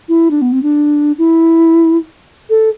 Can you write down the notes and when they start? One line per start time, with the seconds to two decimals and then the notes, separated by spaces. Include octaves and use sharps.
0.09 E4
0.31 D4
0.42 B3
0.52 C4
0.63 D4
1.18 E4
2.50 A4